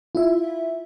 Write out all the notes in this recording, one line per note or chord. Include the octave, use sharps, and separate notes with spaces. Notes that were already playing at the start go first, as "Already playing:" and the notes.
E4 F4 E5